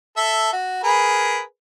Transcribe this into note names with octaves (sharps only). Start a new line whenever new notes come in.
A4 E5
F#4
G#4 A#4 B4